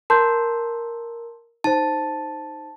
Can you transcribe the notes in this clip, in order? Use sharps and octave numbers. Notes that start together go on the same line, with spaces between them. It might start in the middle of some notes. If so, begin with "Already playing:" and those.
A#4 A5 C6 G6
D#4 C5 A5